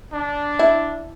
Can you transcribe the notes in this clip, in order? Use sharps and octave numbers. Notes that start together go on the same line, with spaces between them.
D4
E4